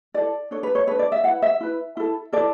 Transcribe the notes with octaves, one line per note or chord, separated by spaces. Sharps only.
E4 A4 D5
D4 A4 C#5
B4
C#5
D4 A4 B4
D5
E5
E4 B4 F#5
E5
E4 B4
E4 A4
E4 A4 D5